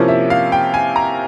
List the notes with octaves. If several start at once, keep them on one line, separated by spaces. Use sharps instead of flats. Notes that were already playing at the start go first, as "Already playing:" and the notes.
Already playing: C3 F3 A#3 C#4 E4
E5
F5
G5
G#5
A#5